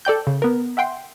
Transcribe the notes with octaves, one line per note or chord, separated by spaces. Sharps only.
A4 D5 G5 G6
C#3
B3 A#4
E5 F#5 G5 C6